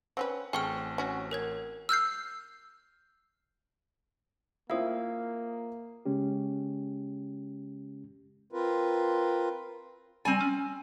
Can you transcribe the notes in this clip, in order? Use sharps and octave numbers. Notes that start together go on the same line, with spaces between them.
C4 C#4 B4 F#5
A1 C4 G#4 A4 G5 C#6 F6 C#7
C#4 F#4
A#4 C#5 G#6
E6 F6 G6 C7
A#3 C4 E4 F4 F5 D#6
C#3 G#3 C#4 G4
C4 F4 A#4 B4
G3 C4 G#5
C#4